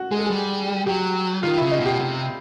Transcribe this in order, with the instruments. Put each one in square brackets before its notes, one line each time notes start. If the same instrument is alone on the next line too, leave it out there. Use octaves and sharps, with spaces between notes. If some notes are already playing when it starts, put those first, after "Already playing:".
Already playing: [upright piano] F#4
[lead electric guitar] G#3 [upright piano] G#4
[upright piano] A4
[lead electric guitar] G3 [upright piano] G#4
[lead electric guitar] F#3 [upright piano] G4
[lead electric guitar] D#3 [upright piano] F4
[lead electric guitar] C#3 [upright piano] E4
[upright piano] D#4
[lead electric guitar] B2
[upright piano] G4
[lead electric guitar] C3